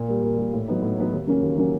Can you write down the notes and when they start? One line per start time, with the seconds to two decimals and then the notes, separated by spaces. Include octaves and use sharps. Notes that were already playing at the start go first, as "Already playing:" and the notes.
Already playing: A#2
0.08 G3 A#3
0.23 A#2
0.38 G3 A#3
0.53 A2
0.68 F#3 B3 D#4
0.82 A2
0.98 F#3 B3 D#4
1.12 D#2
1.27 C#3 F#3 A#3 C#4
1.42 D#2
1.57 C#3 F#3 A#3 C#4